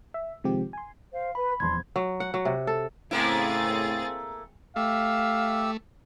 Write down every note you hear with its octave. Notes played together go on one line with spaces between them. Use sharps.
E5
C3 D#3 F3 G#3 C4 G4
G#5 C6
C5 F5
B4 B5
D#1 E2 F3 D4 C6 G#6
F#3
F#5
F#3
C3
A4
A2 C#3 A3 A#3 C4 E4 G#4 A6
A3 G4 E5 F5 E6